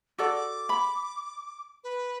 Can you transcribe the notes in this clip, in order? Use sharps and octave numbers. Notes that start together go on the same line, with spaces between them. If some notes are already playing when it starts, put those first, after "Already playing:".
F#4 A4 D5 D6
B5
B4